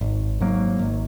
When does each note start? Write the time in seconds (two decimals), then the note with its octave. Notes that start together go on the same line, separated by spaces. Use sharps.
0.01 G#1
0.40 G#2 F#3 A#3
0.79 G#1